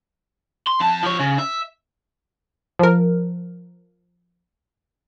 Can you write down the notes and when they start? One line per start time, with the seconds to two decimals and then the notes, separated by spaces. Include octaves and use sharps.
0.67 C6
0.80 F2 A5
1.03 F3 C#5
1.20 C#3
1.39 E5
2.79 F3 A#4